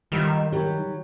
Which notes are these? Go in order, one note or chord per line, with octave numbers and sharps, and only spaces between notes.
D#3 G3 F4 E5
F#3 G3 G4